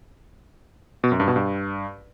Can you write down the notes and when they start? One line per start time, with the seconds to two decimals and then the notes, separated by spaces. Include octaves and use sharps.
1.04 B2
1.12 F#2
1.20 G2
1.28 B2
1.36 G2